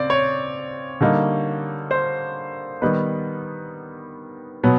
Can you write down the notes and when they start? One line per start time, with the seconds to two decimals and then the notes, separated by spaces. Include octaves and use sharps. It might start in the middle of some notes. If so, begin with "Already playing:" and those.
Already playing: C#3 C4 D5
0.10 C#5
1.01 D3 G3 A#3 D#4
1.91 C5
2.82 D#3 G3 B3 D#4 B4
4.63 B2 F#3 B3